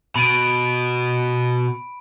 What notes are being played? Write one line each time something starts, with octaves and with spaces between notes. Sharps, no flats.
B2 B5 D7 D#7